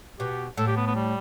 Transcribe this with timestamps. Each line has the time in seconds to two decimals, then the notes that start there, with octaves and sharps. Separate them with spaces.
0.19 B2 G4
0.57 A2 A4
0.67 G4
0.77 B3
0.87 B3
0.95 G3